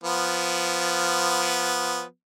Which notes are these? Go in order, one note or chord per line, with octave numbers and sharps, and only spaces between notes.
F3 B3